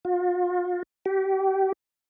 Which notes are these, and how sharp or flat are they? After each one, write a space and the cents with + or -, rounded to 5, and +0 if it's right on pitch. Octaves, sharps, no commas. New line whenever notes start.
F4 +40
G4 -30